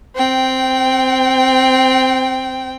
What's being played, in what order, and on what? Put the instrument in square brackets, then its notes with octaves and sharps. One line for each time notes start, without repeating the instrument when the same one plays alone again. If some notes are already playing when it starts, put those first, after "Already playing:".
[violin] C4 G5